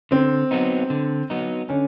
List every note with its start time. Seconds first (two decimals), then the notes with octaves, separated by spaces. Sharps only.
0.11 D3 C4
0.51 F#3 B3 D#4
0.90 D3
1.30 F#3 B3 D#4
1.69 D3 C#4